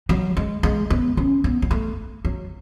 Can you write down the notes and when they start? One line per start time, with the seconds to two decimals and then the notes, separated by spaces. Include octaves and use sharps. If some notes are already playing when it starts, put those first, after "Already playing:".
0.09 F#3
0.37 G#3
0.63 G#3
0.90 B3
1.17 C#4
1.44 B3
1.62 B3
1.71 A3
2.25 F#3